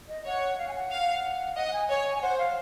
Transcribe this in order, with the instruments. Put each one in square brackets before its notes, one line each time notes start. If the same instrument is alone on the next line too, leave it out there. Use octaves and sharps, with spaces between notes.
[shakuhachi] D#5
[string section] C#5 [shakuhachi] F#5
[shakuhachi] F5
G#5
F#5
[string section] F5
[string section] D#5 [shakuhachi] F#5
[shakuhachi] F#5
G#5
[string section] C#5 [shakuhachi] G#5
[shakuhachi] G#5
[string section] C5 [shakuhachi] F#5
[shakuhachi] F5